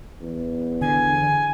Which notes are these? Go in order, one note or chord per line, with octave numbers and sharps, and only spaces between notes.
E2
D3 G#5